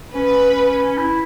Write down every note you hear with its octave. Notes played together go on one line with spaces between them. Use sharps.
C#4 B4
E4